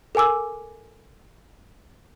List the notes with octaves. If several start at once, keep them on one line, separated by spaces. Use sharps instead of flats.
A4 A#4 G#5 D6 E6